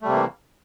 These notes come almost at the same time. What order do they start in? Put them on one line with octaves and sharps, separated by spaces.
A3 G3 C3 A#3 E3